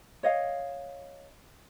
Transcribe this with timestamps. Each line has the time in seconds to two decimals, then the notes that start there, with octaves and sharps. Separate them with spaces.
0.23 C#5 D#5 F5